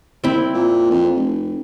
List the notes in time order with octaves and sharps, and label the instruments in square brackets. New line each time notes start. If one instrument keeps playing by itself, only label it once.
[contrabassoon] C2 [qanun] C4 E4
[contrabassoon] A#2
F2
F1